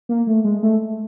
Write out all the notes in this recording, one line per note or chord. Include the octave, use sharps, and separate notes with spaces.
A#3
A3
G#3
A3